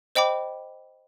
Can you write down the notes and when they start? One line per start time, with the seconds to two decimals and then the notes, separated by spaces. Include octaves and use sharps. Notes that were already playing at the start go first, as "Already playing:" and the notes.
0.15 C5 D#5 G5 B5 D6